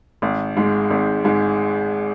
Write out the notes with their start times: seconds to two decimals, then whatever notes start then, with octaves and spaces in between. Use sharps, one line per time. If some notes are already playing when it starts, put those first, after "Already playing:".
0.22 G#1
0.57 G#2 G#3
0.90 G#1
1.24 G#2 G#3